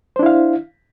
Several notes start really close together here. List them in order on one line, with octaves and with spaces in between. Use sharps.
C5 D4 E4 F5